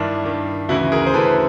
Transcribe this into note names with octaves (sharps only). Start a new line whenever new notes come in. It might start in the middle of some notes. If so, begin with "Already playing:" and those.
Already playing: G2 D#3 D4 E4
G2 D#3
D2 C#3 E3 E4 F#4
G#4 A#4
C5
D2 C#3 E3 A4 B4